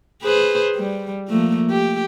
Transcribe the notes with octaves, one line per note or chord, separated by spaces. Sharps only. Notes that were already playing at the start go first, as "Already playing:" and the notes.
G#4 B4 C5
G3
F3 A3 A#3
G4